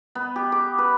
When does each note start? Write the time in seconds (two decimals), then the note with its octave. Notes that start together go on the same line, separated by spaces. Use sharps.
0.15 B3
0.36 G4
0.52 D6
0.78 B4